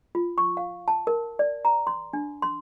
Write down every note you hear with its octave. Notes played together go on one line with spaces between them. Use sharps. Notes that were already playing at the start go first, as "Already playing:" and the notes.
F4
C#6
F5
A5
A#4
D5
A#5
C6
D4
C6